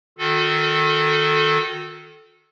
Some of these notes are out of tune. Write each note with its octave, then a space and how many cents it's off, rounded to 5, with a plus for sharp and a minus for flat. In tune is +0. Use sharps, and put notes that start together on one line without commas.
D#3 -10 F#4 -45 A4 -10